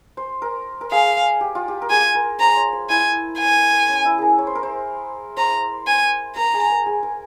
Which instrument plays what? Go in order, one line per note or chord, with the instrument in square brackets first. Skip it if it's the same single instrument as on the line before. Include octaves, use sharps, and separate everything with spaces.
[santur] C5
A#4
A#4
[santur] G#4 [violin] F5
[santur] G4
F4
G4
A#4
[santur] G#4 [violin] G#5
[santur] A#4
[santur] C5 [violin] A#5
[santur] C#5
C5
[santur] E4 [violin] G#5
[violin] G#5
[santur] C#4
E4
G#4 A#4
C#5
C5
A#4
C5
[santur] C5 [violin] A#5
[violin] G#5
[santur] A#4 [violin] A#5
[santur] G#4
A#4
G#4
A#4